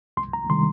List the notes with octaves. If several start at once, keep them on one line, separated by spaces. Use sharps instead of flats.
C2 C6
A#5
C3 D#3 G3 C6